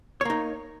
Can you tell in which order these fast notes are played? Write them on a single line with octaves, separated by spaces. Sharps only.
C#5 A#3 D#4